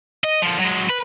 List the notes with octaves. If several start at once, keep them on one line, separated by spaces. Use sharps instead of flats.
D#5
D3 F3
F#3 G#3
B4